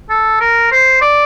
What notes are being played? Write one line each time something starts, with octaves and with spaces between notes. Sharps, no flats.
A4
A#4
C5
D5